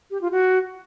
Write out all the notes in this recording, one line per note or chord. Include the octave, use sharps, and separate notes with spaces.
G4
F4
F#4